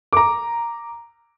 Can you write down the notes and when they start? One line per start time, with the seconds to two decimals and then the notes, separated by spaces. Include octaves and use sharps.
0.13 A#5 D6